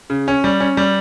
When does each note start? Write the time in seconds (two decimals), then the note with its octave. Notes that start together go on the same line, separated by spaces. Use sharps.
0.10 C#3
0.28 C#4
0.44 G3
0.60 C#4
0.77 G3